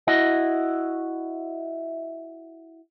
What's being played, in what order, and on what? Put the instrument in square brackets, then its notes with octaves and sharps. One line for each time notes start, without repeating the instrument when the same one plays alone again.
[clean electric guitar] E4 F#4 D#5